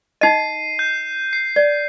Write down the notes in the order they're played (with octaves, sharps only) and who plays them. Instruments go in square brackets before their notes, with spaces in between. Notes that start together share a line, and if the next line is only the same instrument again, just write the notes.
[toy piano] D#4 D#5 [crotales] C7 D#7
[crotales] G6
C7
[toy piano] D5